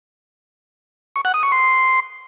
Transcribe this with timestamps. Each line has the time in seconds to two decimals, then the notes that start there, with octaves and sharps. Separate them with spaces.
1.16 C#6
1.25 F#5
1.34 D#6
1.43 C#6
1.52 C6